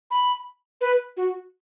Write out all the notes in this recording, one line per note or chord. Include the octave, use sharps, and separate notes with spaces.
B5
B4
F#4